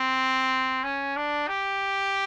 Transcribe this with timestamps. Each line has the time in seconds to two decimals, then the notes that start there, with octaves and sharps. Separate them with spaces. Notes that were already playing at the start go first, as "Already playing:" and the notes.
Already playing: C4
0.84 C#4
1.16 D4
1.48 G4